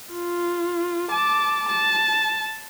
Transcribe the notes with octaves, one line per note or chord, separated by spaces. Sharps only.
F4
A5 D6
A5